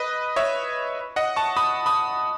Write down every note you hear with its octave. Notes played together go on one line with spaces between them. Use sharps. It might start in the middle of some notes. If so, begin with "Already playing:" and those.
Already playing: B4 D#5
C#5 E5
D#5 F#5
A5 C#6
B5 D#6
B5 D#6